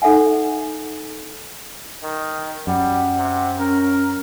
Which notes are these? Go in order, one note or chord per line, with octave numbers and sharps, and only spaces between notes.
D#4 A4 E5 F#5 G#5
D#3
F#2 G3 F#5
C3
C#4 A#4